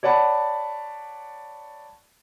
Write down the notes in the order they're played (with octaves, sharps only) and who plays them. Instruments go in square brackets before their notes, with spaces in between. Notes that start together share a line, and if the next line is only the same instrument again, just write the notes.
[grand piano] C#5 D5 F#5 A5 B5